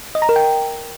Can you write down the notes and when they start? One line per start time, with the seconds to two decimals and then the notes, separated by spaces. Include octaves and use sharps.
0.15 D#5
0.22 A#5
0.29 A#4
0.36 G5